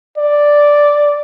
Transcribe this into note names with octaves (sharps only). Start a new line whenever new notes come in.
D5